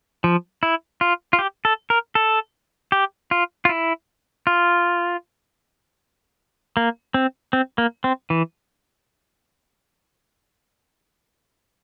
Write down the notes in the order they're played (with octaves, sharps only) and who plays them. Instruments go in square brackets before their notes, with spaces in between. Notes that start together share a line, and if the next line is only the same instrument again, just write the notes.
[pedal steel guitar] F3
E4
F4
F4
G4
A4
A#4
A4
G4
F4
F4
E4
F4
A#3
C4
C4
A#3
C4
E3